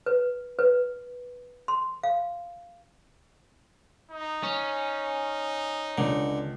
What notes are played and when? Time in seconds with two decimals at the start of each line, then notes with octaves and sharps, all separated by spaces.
0.06 B4
0.59 B4
1.68 C6
2.03 F5
4.11 D#4
4.43 C#4
5.98 C#2 D3